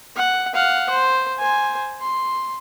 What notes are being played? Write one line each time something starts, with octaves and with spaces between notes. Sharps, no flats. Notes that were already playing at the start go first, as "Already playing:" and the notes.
F#5
F5 F#5
C5
C5 G#5
C6